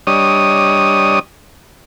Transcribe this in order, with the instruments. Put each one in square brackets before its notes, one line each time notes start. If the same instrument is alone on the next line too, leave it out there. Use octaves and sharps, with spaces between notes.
[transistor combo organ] G3 D4 C#5 D#5 D#6